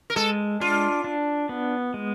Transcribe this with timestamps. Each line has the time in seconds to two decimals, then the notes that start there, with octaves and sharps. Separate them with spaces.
0.10 A#4
0.16 G#3 A4
0.60 D4 F4
1.04 D4
1.49 B3
1.94 G#3